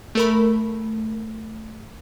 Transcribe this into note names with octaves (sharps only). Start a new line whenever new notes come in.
A3 A#4 B5